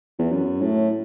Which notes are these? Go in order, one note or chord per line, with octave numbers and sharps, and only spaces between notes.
E2
F#2
A2